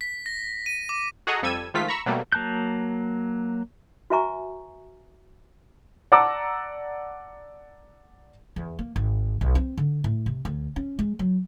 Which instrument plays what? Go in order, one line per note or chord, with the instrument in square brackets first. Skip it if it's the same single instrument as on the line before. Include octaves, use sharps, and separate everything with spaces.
[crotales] B6
A#6
D#7
D6
[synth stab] F#4 G#4 A4 D#5 F#5 A#5
F2 G3 A4 E6 G#6 D#7
D#3 F3 G#3 A3 F4 B6
A#5 B5 C#6 E6
B2 F#3 G3 A3 A#3
[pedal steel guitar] F#3 A#3 A5 F#6 G6
[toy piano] F#4 B4 E5 G#5 A#5 C#6
[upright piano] D5 F#5 A5 A#5 D6 E6
[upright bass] E2
A#3
G#1
B1
C4
D3
A2
C3
D2
C#4
G#3
F#3